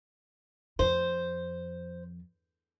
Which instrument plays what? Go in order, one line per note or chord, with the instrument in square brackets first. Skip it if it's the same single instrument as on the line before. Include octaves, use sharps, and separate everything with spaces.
[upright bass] F2 [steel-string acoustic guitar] C5